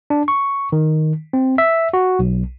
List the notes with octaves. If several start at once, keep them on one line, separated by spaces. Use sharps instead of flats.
D4
C#6
D#3
C4
E5
F#4
B1